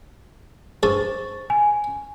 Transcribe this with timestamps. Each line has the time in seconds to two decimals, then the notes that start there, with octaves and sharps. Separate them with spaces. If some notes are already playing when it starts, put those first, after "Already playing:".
0.83 G2 G#4 A4 C5 C#6 A6
1.50 G#5